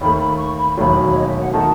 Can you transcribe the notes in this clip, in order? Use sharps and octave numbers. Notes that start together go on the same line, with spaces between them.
D#2 D#3 A3 B5
C#6
B5
C#6
B5
E1 D#2 D#3 F#3 A3 B5
C#5
D#5
E5
F#5
D#3 A3 D#4 F#4 A5